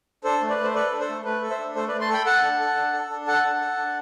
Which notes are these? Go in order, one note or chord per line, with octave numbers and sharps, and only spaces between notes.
D4 A4 C5
A3
B4 D5
A3
C5
A4 B4 D5
D4
A4 C5
A3
A3 B4
A4
C5 E5
D4
A3 A4 C5
B4 D5
A3
A5 C6
A4 G5 B5
A4 F#5 A5
D4
A4
D4
A4
D4
A4 F#5 A5
D4
A4
D4